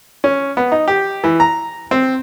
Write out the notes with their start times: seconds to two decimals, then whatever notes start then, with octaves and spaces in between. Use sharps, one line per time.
0.24 C#4
0.57 B3
0.72 D#4
0.88 G4
1.24 E3
1.40 A#5
1.91 C4